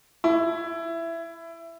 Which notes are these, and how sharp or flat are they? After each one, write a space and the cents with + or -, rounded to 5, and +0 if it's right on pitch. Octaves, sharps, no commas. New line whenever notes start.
E4 +15